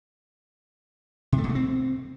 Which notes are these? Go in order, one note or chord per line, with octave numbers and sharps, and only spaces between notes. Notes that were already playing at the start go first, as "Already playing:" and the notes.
C3
A3
B2
A3
C4